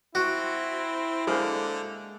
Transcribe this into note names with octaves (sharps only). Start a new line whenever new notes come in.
C4 E4 F#4
D3 G#3 A#3 C5